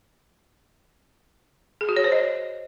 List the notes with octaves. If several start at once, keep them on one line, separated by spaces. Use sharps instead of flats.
G#4
F#4
C#5
C5
D#5